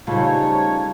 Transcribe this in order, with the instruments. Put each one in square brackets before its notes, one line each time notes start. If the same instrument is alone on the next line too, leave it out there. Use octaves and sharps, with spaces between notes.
[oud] C#3 G3 C5 [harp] A3 [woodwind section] D#4 C#5 [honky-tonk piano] F4